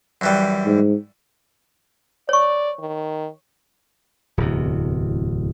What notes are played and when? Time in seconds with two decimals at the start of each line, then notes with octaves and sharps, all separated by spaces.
0.21 F#2 E3 G3
0.66 G#2
2.29 C#5 D5 C#6
2.79 D#3
4.37 D1 E2 C3